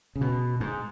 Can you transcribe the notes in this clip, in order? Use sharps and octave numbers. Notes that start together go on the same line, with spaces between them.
C#3
B2
G#2